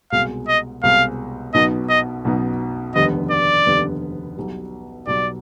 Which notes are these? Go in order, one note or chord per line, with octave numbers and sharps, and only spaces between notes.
C2 B2 G#3 F5
D#5
C2 B2 G#3 F5
B1 B2 B3 D#4 D#5
D#5
B1 B2 B3 D#4
F1 D#2 D3 G3 B3 D#5
D5
F1 D#2 D3 G3 B3
B1 B2 G3
B1 B2 G3 D5